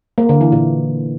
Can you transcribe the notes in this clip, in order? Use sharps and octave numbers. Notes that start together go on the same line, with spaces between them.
A#3
D3
E3
A#2